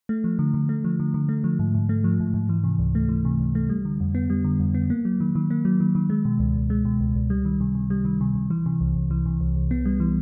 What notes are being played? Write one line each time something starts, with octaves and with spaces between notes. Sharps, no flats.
A3
F3
D3
D3
A3
F3
D3
D3
A3
F3
G#2
G#2
A3
F3
G#2
G#2
E3
C3
C#2
A3
E3
C3
C#2
A3
G3
D3
F2
B3
G3
D3
F2
B3
A#3
F#3
D#3
D#3
A#3
F#3
D#3
D#3
G#3
B2
C#2
C#2
G#3
B2
C#2
C#2
G3
D#3
C3
C3
G3
D#3
C3
C3
E3
C3
C2
C2
E3
C3
C2
C2
B3
G3
E3